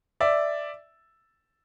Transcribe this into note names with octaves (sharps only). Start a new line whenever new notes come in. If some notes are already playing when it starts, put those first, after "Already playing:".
D5 E5